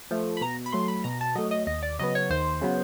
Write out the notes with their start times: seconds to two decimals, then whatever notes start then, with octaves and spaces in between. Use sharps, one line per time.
0.11 F3 A3
0.37 B5
0.41 B2 A#5
0.66 B5
0.72 F#3 A3 C6
0.88 B5
1.04 B2 A#5
1.21 A5
1.35 F#3 A3 D#5
1.51 D#5
1.67 D#2 D#5
1.83 D5
1.99 C#3 F#3 B3 D#5
2.15 C#5
2.30 D#2 C5
2.61 C#3 F#3 B3